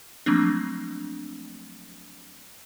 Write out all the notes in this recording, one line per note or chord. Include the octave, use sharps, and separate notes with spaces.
F3 F#3 A3 A#3 C4 D4